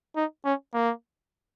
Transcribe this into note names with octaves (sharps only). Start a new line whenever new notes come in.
D#4
C#4
A#3